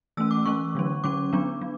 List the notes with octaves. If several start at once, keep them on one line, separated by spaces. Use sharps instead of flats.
E3 A3 C#4 E6
D6
E3 A3 C#4 C#6
D3 F#3 C#4
D3 F#3 C#4 D6
F#3 B3 D4
F#3